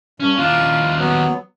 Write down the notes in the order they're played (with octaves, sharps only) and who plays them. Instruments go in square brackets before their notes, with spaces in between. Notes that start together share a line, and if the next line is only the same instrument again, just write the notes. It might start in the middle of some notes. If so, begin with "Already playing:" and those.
[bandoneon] G2 [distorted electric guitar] C#4
[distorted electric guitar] D#2 D4 [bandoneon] F4
[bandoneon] F#3 B3